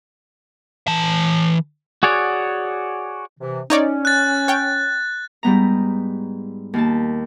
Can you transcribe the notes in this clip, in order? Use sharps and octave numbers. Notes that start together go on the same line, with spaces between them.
E3 A5
F#4 G#4 C#5 D5 F#5
C3 E3
C#4 D#4 C#5 D5
F#6 A6
C#5 G5
G#2 G3 B3 A#5
D#2 A#3 A5